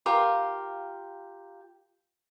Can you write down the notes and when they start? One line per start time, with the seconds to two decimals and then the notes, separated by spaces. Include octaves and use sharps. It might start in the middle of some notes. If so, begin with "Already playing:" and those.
0.06 F4 G4 A#4 F5